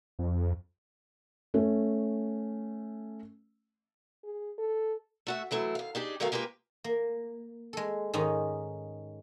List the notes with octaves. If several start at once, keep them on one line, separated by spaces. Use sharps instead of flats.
F2
A3 C#4
G#4
A4
A3 F#4 E5
E3 F#3 A3 E4
D#2 F5
D4 D#4 G4 G#4
D#3 F#3 A3 B3 A#4 F5
G#3 A#3 F4 G4 B4
A#3
G#3 A4
G#2 D#3 C#4 D#4